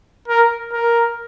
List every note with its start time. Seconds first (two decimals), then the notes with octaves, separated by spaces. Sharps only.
0.28 A#4
0.73 A#4